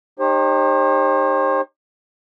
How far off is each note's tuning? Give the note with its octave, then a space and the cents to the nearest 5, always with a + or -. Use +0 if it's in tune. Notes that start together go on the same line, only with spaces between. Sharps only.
D#4 -30 G4 +25 C5 +40